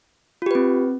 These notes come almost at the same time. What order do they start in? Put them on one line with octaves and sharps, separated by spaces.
F4 G4 B4 C4